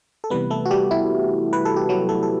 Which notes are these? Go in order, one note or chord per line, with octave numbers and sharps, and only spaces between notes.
A4
C3 E3 G3 B3 B4
A3 A4
F#4
G3 G4
E4
B4
A4
G4
F#3 F#4
A3 A4
A4